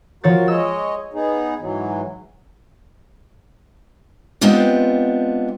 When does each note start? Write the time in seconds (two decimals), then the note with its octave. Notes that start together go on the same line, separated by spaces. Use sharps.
0.24 F3 F#4 A#4 C#5 A6
0.48 G#3 C#5 D#5 E6
1.14 B3 D#4 G#4
1.59 G#2 E3 F#3
4.41 G#3 B3 C4 D4 F4 G4